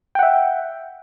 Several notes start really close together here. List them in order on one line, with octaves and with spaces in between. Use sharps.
G5 F#5 E5